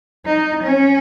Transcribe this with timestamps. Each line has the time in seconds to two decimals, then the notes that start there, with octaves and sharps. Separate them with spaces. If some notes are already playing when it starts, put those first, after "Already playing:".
0.26 D#4
0.63 C#4